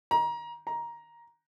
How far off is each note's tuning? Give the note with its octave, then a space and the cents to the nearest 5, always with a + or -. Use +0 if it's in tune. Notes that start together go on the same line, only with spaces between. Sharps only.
A#5 +25
A#5 +10